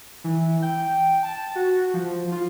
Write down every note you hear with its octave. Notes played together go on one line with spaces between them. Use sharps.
E3
G5
A5
F#4
F3
F4